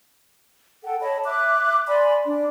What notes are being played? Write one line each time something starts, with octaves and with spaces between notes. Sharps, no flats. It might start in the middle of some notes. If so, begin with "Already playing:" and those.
A4 F#5 G5
C#5 D#5 A5 B5
E5 D6 F#6
D5 G#5 B5 C6
D4